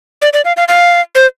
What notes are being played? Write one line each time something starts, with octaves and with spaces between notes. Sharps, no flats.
D5
D5
F5
F5
F5
C5